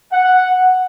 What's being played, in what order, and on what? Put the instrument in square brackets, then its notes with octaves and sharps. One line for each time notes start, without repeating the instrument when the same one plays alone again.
[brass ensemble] F#5